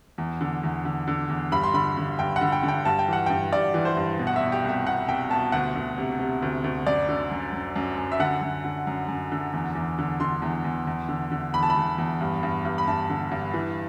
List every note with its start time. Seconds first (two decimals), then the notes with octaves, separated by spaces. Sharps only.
0.18 E2
0.41 D3
0.63 E2
0.85 D3
1.08 D3
1.29 E2
1.51 G2 B5
1.63 C6
1.74 D3 B5
1.97 D3
2.19 G2 G5
2.36 F#5
2.41 D3
2.52 G5
2.63 D3
2.68 G5
2.85 G2 A5
2.99 G5
3.08 E3 F#5
3.26 G2 G5
3.52 G2 D5
3.74 E3
3.85 C5
3.97 G2
4.19 B2
4.27 F#5
4.36 B2 E5
4.52 G4
4.64 C2
4.69 G4
4.86 B2 F#5
5.08 C2 G5
5.31 B2 A5
5.52 D2 F#5
5.76 D2
5.98 C3
6.19 C3
6.42 D2
6.64 D2
6.86 F#2 D5
7.09 D3
7.31 F#2
7.53 F#2
7.76 F#2
7.97 F#2
8.12 E5
8.19 D3 F#5
8.42 F#2
8.65 D3
8.87 F#2
9.08 F#2
9.32 D3
9.53 E2
9.75 E2
9.99 D3
10.20 D3 C6
10.42 E2
10.64 E2
10.87 E2
11.09 D3
11.32 D3
11.54 E2 B5
11.63 A5
11.70 B5
11.77 E2
11.98 E2
12.21 G2
12.43 G2
12.65 G2
12.78 B5
12.88 G2 A5
13.10 D3
13.31 G2
13.54 E3